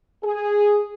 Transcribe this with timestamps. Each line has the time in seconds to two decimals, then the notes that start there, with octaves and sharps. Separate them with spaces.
0.24 G#4